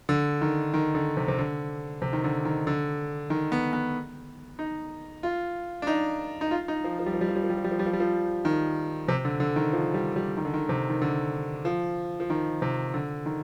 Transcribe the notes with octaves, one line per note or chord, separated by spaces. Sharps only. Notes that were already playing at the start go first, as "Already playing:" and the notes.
D3
D#3
D#3
D3
C3
C3
D3
C3
D#3
D3
D#3
D3
D#3
B3
B3
D#4
F4
D4
D#4
D#4
F4
D#4
F3
F3
G3
F3
G3
F3
G3
F3
G3
F3
G3
F3
G3
F3
G3
F3
D#3
C3
D3
D3
D#3
F3
G3
G3
D#3
D3
D#3
C3
D#3
D3
F3
F3
D#3
C3
D3
D#3